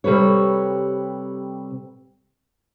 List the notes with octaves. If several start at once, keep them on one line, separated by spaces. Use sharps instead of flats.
C3 G3 A4 B4 C#5